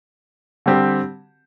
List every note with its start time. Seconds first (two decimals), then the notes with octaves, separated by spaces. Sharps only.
0.66 D3 G3 C4 G4